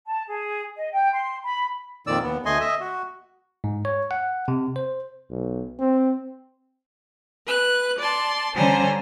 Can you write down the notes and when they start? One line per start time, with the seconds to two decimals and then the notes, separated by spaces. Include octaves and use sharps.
0.06 A5
0.28 G#4
0.76 D#5
0.92 G5
1.13 C6
1.43 B5
2.07 F2 A#2 D#3 D5 E6
2.23 D#2 B3
2.46 D2 A3 D#5 G#5 C6
2.60 D#5 E5
2.80 F#4
3.64 G#2
3.85 C#5
4.11 F#5
4.48 C3
4.76 C5
5.31 B1
5.79 C4
7.46 B4 F#6
7.99 D5 A5 C6
8.54 D3 G3 C#4 C5 G#5 A#5